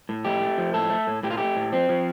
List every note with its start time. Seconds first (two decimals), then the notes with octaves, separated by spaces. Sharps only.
0.09 A2
0.25 A3 G4
0.41 A3
0.58 F3
0.74 A2 A4
0.90 A3
1.07 A2
1.23 A2 G4
1.31 F4
1.37 A3 G4
1.56 A2
1.72 F3 C4
1.89 F3